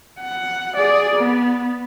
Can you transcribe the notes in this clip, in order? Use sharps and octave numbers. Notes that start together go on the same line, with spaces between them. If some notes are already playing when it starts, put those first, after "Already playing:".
F#5
G#4 D5
B3